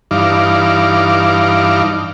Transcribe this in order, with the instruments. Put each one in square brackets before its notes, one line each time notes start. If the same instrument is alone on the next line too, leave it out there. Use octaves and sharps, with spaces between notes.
[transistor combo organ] G2 E3 D#4 F5 D6